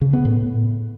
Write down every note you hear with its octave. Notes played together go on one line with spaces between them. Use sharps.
C#3
B3
A2